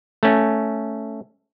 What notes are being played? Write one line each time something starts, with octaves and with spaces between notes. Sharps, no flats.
A3 C#4